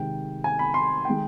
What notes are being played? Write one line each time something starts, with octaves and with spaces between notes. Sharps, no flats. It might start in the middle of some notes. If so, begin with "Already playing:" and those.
Already playing: C3 D#3 G#3 G5
G#5
B5
C6
D#3 G#3 G5